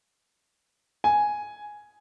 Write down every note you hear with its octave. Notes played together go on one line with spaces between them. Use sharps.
G#5